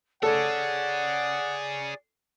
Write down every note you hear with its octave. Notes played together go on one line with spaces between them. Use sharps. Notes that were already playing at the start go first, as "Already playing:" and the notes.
G#4 A4 C#5 D5 F#5